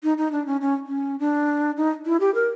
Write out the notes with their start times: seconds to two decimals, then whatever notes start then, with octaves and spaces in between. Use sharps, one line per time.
0.03 D#4
0.18 D#4
0.32 D4
0.47 C#4
0.61 C#4
0.87 C#4
1.19 D4
1.77 D#4
2.06 E4
2.20 G4
2.35 A#4